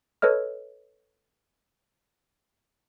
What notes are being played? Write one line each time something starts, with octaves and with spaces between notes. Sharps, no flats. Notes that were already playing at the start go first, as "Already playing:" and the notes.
A4 B4 C#5 D#5 F6